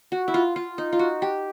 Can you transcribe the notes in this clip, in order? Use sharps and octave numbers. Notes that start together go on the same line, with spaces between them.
F#4
E4
F4
F4
D#4
F4
F#4
G4